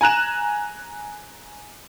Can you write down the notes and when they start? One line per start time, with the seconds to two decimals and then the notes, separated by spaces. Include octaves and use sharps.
0.01 G#5 A#5 F#6 E7